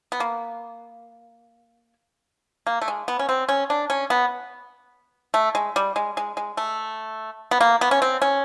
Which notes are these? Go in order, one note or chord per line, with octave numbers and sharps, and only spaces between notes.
B3
A#3
A#3
A3
G#3
B3
C#4
C4
C#4
D4
C#4
B3
A3
G#3
G3
G#3
G#3
G#3
A3
B3
A#3
B3
C#4
C4
C#4